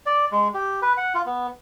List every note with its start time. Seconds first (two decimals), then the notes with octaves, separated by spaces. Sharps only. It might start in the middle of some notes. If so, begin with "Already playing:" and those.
0.06 D5
0.32 G#3
0.54 G4
0.82 B4
0.97 F#5
1.15 F4
1.26 B3